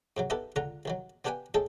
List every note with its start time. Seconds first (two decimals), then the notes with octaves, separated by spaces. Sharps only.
0.17 G#2 C3 F#3
0.30 B3 D#4 E4 G4 A4 B4
0.56 C#2 D3 F4 F#5 A#5
0.85 C2 D#3 F#3
1.25 B3 D4 G4 B4 G5 G#5
1.54 A2 G#3 G#4 A4 G5 A5